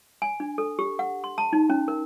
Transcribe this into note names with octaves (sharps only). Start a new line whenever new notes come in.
G#5
D4
A4
G4
F#5
C6
A5
D#4
C#4
A#4